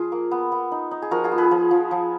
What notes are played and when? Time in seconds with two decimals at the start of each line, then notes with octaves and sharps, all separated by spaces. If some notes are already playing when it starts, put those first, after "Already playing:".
Already playing: F3 F4 G#4
0.12 A#3
0.31 B3
0.52 B3
0.72 D#4
0.91 D#4
1.02 G#4
1.11 F3 F#4 A#4
1.24 F4 G#4
1.31 B3
1.38 G#4 B4
1.51 F3
1.71 F3
1.91 F3